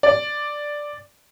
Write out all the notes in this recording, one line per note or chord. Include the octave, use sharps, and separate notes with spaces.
D5